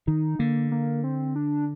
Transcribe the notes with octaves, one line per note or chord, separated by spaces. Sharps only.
D#3 D#4
D3 A#3
A#3
C4
D4